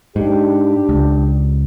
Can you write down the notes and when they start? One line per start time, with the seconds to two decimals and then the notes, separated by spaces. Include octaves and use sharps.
0.16 G#2 D4 G4
0.89 C#2